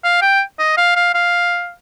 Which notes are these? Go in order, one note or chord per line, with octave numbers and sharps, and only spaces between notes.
F5
G5
D#5
F5
F5
F5